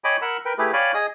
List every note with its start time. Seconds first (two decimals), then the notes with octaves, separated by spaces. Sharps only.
0.04 C#5 D#5 G5 G#5 B5 D6
0.22 A#4 F#5 B5 E6
0.45 A#4 B4 G5
0.58 A3 E4 G4 G#4 B4
0.73 C#5 D5 F5 G5 G#5 B5
0.94 G#4 D#5 D#6